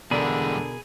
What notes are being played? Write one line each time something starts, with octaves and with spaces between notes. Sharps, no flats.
E2 B2 D3 G3 G#3 G#4 A#4 B5